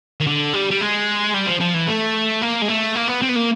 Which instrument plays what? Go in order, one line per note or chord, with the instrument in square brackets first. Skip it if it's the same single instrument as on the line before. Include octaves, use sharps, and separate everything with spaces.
[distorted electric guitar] D#3
D3
G3
G3
G#3
G3
F3
F3
E3
A3
A#3
G#3
A3
A#3
B3
C4
B3
A#3